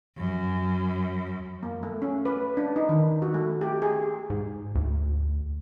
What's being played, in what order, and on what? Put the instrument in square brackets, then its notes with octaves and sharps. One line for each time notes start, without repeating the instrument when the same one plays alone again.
[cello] F#2
[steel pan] A#3
A3
C#4
B4
D4
D#4
D#3
F#4
A3
G4
G#4
[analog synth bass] G#2
D2